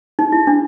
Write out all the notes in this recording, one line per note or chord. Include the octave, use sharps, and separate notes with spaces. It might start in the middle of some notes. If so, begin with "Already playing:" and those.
D#4
E4
D4